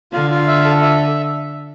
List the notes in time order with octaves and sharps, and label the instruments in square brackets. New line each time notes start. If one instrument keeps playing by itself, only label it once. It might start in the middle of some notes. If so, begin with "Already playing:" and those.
[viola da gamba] D3 [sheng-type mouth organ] F4
[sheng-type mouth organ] F4
E5
A4
E5